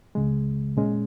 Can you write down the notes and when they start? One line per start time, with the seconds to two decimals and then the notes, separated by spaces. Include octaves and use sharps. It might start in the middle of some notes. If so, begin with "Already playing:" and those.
0.15 C#2 C#3 G#3
0.77 A#2 G#3 C#4